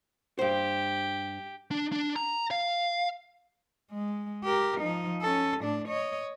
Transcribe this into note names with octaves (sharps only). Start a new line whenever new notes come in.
G2 G4 C5
D4
D4
A#5
F5
G#3
G4 A#4
F3 D#4
C#4 A4
A2 D4
C#5 D#5